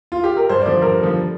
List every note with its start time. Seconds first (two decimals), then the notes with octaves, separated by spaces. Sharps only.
0.12 F4
0.24 G4
0.37 A#4
0.49 G2 C5
0.62 D5
0.66 D3 F3 C5
0.82 G2 A#4
0.99 D3 F3